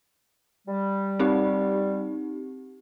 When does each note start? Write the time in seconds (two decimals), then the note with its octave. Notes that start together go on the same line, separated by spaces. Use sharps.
0.67 G3
1.19 C4 D#4 G4